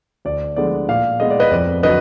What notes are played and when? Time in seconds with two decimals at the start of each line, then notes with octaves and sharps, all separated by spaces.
0.25 D2 D5
0.56 D3 F3 G#3 B3 D5
0.88 A#2 D5 F5
1.20 G#3 B3 D#5
1.30 D5
1.40 B4 D#5
1.51 F2 D5
1.83 D3 F#3 B4 D#5